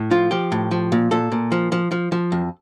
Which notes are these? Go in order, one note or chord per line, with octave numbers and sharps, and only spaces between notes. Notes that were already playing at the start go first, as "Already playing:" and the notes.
Already playing: A2
F3 F4
F3 G4
A2
F3
A#2
A#2 A4
A#2
F3
F3
F3
F3
F2